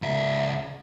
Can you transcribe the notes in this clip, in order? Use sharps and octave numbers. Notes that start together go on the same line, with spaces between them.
C#2 E5